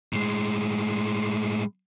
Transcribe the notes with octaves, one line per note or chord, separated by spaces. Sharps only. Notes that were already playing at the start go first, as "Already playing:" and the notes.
A2 G#3